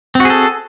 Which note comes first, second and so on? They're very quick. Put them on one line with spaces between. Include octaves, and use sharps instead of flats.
C4 F#4 G#4 A4